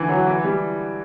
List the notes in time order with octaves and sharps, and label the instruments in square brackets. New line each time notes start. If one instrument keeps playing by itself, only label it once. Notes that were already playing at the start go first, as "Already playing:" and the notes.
Already playing: [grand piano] D3 E3
F#3
E3
G3